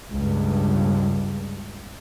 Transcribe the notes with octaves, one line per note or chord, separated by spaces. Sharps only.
C#2 G2